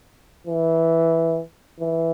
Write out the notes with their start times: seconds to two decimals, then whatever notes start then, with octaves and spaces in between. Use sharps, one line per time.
0.47 E3
1.80 E3